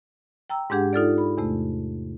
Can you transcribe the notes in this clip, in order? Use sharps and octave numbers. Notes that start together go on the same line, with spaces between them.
G5 A#5 E6
G#2 G#3 D4 G4 G#4 F#5
D#4 F4 A4 D5
B5
E2 C3 A3